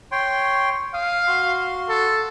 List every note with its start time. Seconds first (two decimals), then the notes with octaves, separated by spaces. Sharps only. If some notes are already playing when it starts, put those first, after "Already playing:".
0.12 C#5 G5 C6
0.94 F5 D#6
1.28 F#4 C6
1.89 A4